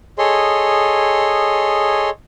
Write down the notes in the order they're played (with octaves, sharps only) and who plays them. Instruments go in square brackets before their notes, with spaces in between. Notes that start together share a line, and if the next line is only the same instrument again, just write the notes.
[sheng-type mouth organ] G#4 A4 C#5 D#5 C6